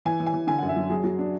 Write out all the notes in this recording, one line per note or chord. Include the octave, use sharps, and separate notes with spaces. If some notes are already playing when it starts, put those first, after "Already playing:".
E3 G#5
E3
G#5
E3
D3 G#5
F#2 F#5
E5
F#3
F#3 G#4
F#3 F#4
D4